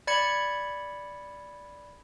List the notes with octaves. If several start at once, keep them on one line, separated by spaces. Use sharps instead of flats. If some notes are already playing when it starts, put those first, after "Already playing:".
D5 B5 G#6 C#7